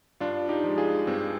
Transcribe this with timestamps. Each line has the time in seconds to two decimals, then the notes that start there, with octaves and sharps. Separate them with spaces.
0.20 G2 D4 F4
0.49 D#4 G4
0.64 F3 G#3
0.78 F4 G#4
1.07 G2 C4